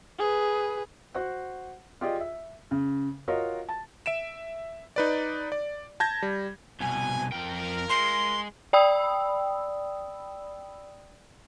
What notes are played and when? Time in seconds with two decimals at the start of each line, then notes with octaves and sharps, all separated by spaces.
0.19 G#4 B4
1.15 F#4 C5 F#5
2.01 F4 G4 G#4 D5 D#5
2.20 E5
2.71 C#3
3.28 F4 F#4 A#4 C#5 D#5 F5
3.69 A5
4.06 E5 D7 E7
4.96 D#4 B4 D5
5.52 D5
6.00 A5 G6 G#6 A#6
6.22 G3
6.80 C2 B2 G#5
7.32 F2 F4 A#4 G5
7.89 G#3 C6
8.73 D5 G5 B5 D#6 E6